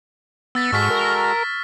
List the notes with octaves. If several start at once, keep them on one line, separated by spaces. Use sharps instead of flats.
B3 E6 A6 B6
G#2 G#3 F#4 A4 C#6 F6 B6
A#4